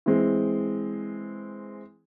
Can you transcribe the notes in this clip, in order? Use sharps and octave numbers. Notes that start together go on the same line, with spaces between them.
E3 G#3 C4